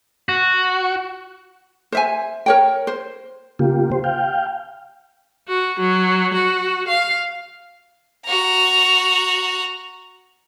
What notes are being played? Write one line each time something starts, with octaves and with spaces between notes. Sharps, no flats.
F#4
C5 E5 G#5
A#4 C#5 G5
C5
C#3 A#3 F4 G4
G4 C5
F5 G5
F#4
F#3
F#4
F5
F#4 A#5